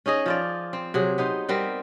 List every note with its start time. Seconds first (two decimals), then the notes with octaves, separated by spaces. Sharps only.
0.06 C#4 D#4 G#4 D#5
0.26 F3 F4 D5
0.73 C4
0.94 C3 F#3 G#4
1.18 B3 D#4 C5
1.49 G3 B3 C4 A#4